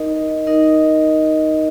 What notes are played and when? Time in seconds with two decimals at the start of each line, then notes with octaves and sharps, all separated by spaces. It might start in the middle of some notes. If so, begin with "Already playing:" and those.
Already playing: D#4 A#4 D#5
0.47 D#4 A#4 D#5